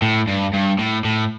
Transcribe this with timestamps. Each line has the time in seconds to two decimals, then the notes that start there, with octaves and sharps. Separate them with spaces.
0.02 A2
0.27 G2
0.53 G2
0.79 A2
1.04 A2